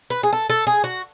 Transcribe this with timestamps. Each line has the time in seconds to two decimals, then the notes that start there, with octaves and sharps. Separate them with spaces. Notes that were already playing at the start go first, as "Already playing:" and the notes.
0.10 B4
0.23 G#4
0.33 A4
0.50 A4
0.67 G#4
0.84 F#4